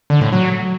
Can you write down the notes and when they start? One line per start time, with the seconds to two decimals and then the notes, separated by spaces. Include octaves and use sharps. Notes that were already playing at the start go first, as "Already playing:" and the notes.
0.10 D3
0.21 A2
0.33 F#3